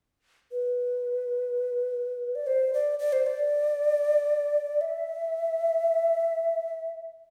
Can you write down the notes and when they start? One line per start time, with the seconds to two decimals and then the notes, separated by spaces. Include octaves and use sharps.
0.52 B4
2.35 D5
2.47 C5
2.74 D5
2.99 D5
3.13 C5
3.26 D5
4.81 E5